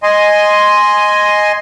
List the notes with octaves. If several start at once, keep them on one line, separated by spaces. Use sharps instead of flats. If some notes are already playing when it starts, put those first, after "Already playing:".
D#5 G#5 C6